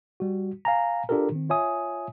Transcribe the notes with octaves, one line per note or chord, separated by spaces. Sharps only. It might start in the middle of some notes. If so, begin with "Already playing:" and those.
G3 F#4
F5 G#5 A#5
D4 F4 G4 A4 A#4
D#3 C4
F4 C#5 E5 G#5 D#6